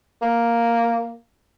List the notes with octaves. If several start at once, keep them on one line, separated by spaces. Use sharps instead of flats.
A#3